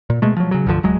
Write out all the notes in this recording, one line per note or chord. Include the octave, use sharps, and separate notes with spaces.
A#2
B2 G#3 A3
F3 F#3
C#3 F#3
C2 G2 D3 F3
D1 F#3 G#3